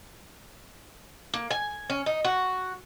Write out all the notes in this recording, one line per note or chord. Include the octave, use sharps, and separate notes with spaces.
A#3
G#5
C#4
D#4
F#4